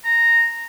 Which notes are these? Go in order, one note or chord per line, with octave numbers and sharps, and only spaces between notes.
A#5